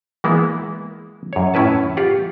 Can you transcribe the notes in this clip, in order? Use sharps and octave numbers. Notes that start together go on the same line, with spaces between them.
E3 G#3 A#3 B3 E4
F#2 C#5
A2 C#4 E4 B4 A5
F4 G4 F#5